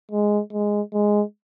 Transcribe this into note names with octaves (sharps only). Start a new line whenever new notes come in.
G#3
G#3
G#3